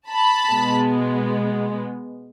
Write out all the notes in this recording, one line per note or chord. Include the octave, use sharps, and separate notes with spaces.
A5 B5
B2 G#3 B3